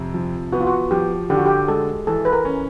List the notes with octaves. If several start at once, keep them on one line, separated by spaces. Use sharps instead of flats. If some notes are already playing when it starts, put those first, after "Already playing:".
Already playing: F2 C3
F3
B3 F#4
F4
F#4
F3 G4
D3 G4
F#4
G4
G#3 A4
E3 A4
B4
A#4
C#4